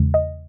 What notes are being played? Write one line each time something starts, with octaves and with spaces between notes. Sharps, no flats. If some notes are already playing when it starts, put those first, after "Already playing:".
Already playing: E2 C#3 G#3
D#5